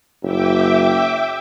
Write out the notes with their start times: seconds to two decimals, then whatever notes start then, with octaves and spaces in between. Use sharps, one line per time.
0.23 F#1 E5 G5 D6